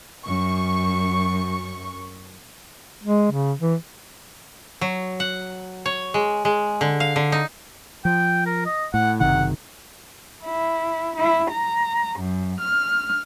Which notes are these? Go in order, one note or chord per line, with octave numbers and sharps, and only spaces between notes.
F#2 C#6
G#3
C#3
E3
F#3
F#5
C#5
G#3
G#3
D3
F5
D3
D#4
F3 G5
A#4
D#5
A2 F#5
F#1 C3 D#3 F#5
E4
E4
A#5
F#2
F6